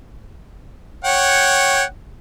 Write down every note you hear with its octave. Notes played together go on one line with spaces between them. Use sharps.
C#5 F#5 G5